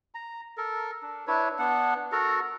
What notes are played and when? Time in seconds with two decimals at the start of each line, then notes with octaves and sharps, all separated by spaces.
0.15 A#5
0.57 A4 A#4
1.02 D4
1.27 D4 E4 B4 C#5
1.59 B3 D4 F#5
2.12 F#4 A4 A#4 A#5